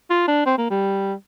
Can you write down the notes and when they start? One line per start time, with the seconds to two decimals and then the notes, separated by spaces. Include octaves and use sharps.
0.10 F4
0.28 D4
0.46 C4
0.58 A#3
0.70 G3